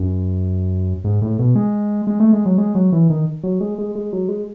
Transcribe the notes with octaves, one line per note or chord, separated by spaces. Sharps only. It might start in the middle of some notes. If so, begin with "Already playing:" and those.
Already playing: F#2
G#2
A2
B2
G#3
G#3
A3
G#3
F#3
G#3
F#3
E3
D#3
F#3
G#3
G#3
G#3
F#3
G#3